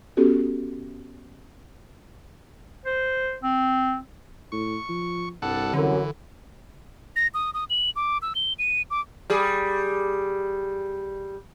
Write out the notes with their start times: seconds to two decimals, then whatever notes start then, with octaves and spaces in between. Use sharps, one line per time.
0.17 B3 C#4 F#4 G4 A4
2.86 C5
3.43 C4
4.52 A2 C#6
4.89 F3
5.42 C2 G2 A4 F#5
5.74 F#2 D3 E3
7.16 A#6
7.34 D#6
7.54 D#6
7.70 F#7
7.96 D6
8.22 E6
8.35 G7
8.59 D#7
8.90 D6
9.30 G3 G#4